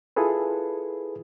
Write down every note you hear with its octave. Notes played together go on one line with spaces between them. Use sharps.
E4 F4 G#4 A4 B4